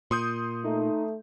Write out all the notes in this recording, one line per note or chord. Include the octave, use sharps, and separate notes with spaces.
A#2 C6 D#6 G6
A3 D#4